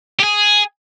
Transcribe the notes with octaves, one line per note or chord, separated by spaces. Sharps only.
G4
G#4